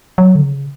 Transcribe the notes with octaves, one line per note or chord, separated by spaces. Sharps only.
F#3
D3
C#3